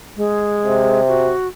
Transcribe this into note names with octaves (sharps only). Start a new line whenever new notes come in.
G#3
C3
F#4